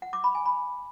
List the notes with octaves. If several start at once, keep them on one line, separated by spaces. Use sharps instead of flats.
F#5
D6
B5
G#5
B5